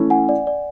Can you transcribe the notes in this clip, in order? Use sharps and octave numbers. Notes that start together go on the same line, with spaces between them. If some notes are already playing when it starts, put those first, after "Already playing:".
Already playing: E3 A3 C#4 E4
F#5 G#5
D5
D5